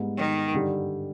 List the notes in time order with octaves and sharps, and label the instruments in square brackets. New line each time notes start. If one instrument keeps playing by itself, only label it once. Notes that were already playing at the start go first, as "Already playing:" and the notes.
Already playing: [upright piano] G#2 G3 B3
[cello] D#3
[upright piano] G2 D3 G3